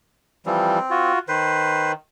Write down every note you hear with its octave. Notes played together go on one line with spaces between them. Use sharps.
E3 F3 G3 C4
F4 F#4
D#3 B4 C5